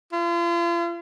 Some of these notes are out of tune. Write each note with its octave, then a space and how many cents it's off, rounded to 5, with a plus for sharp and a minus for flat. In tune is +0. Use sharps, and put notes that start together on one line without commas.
F4 -40